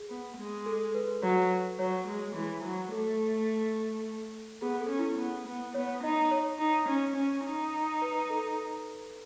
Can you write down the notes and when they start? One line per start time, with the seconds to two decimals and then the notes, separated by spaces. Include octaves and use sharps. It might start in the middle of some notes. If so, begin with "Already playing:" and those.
Already playing: G#4
0.10 B3
0.38 G#3
0.66 A4
0.94 B4
1.23 F#3 C#5
1.79 F#3 C#5
2.08 G#3
2.35 E3
2.64 F#3
2.92 A3 A4
4.62 B3 G#4
4.81 A4
4.90 C#4
4.99 E4
5.18 B3
5.47 B3
5.74 B3 C#5
6.03 D#4 D#5
6.31 C#5
6.59 D#4
6.88 C#4
7.16 C#4
7.45 D#4
8.02 B4
8.30 A4